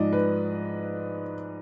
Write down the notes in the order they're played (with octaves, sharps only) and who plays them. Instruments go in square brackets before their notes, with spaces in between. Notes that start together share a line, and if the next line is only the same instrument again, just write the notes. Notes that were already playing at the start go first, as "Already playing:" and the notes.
Already playing: [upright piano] G#2 F3 G#3 D5 D#5
B4